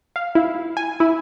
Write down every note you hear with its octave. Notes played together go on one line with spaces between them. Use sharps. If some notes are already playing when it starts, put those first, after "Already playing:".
F5
E4
G#5
E4